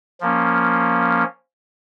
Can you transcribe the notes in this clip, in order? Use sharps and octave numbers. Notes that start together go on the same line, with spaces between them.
F3 A#3 C#4